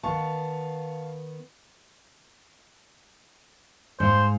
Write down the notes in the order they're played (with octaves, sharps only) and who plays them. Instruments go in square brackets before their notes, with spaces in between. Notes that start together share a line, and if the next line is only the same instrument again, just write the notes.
[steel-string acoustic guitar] D#3 B3 [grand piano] F5 A5 C#6
[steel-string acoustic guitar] G#2 F5 [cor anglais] C5